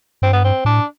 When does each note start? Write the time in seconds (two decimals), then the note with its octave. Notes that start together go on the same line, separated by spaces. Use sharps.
0.22 G2 C4
0.33 B3
0.44 C4
0.65 A2 D4